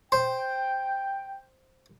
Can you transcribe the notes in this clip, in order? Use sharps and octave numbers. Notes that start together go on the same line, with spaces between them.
C5 G5